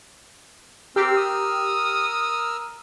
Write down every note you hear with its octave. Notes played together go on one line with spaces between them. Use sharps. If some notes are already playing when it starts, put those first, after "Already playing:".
C4 G4 A#4 E6 F6
D#6